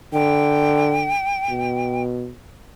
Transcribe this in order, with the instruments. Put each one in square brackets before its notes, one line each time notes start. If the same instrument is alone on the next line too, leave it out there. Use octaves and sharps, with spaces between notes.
[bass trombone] D3 [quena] G5
[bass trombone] B2